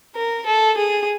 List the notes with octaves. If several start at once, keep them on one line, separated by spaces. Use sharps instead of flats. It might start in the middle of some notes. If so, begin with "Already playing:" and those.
A#4
A4
G#4